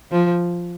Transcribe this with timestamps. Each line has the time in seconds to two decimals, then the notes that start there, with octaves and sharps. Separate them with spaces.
0.11 F3